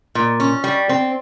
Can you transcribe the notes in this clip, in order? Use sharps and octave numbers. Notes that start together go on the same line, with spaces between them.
A#2
C#4
G3
C4